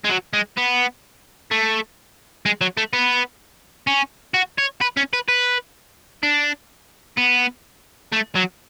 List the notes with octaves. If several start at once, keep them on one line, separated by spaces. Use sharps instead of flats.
G#3
F#3
G#3
B3
A3
G#3
F#3
A3
B3
C#4
F#4
C#5
B4
C#4
B4
B4
D4
B3
A3
F#3